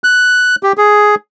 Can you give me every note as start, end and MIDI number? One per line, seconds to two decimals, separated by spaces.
0.04 0.56 90
0.63 0.73 67
0.78 1.15 68